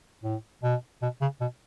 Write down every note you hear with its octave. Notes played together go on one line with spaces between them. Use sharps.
A2
B2
B2
C#3
B2